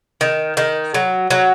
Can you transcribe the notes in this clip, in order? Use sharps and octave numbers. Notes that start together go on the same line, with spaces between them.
D#3
D#3
F#3
F#3